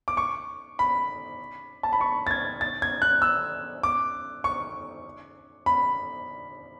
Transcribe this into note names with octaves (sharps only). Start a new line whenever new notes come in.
D6
C#6
B5
A5
B5
C#6
A6
G#6
A6
G#6
F#6
E6
D6
C#6
B5